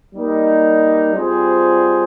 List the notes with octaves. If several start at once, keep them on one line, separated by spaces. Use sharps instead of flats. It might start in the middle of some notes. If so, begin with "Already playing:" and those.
G3 A#3 D#4
G3 C4 F4 G#4 C5